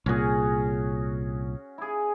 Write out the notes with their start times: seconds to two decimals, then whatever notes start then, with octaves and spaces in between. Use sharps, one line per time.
0.06 C2 A#2 C#4 F#4 G#4
1.78 E4 G#4